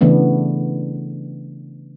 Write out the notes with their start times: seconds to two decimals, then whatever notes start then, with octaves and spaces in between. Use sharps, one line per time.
0.01 C#3 E3 A3 B3 D4